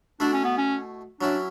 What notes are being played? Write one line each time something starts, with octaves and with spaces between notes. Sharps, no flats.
B2 A3 D4 E4
C#4
B3
C#4
F#3 C#4 D4 E4